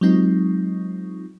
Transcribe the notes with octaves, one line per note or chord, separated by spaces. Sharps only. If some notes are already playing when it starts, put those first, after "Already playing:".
F#3 G#3 C4 D#4 F4